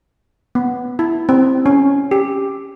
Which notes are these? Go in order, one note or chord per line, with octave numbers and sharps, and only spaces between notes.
B3
E4
C4
C#4
G4